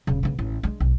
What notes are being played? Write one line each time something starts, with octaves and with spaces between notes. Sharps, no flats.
D#1 C#3
C#3 B3
A1
G#3 D4
B1